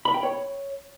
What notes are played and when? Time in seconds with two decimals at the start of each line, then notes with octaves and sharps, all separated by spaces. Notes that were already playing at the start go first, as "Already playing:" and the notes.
0.05 B5
0.14 G5
0.23 C#5